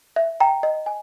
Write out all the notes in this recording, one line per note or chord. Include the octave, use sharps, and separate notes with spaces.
E5
G5 A#5
D#5
G#5